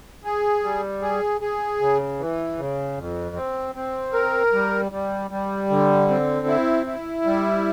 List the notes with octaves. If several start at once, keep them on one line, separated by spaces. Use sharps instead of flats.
G#4
G3
G#4
G#4
C#3
E3
C#3
F2
C4
C4
A#4
G3
G3
G3
D3
C4
E4
E4
G3